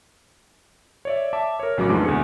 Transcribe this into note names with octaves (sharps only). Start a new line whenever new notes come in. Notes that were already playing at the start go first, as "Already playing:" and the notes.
C#5 D5 E5
E5 A5 D6
A#4 C#5
A1 C#3 F#3 F#4 A#4 D6
F2 G#2 E3 G#3 A3 D4
D2 B2 G#4 C#7